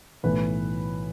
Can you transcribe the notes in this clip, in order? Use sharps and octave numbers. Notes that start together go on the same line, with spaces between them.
B1 A2 E3 B4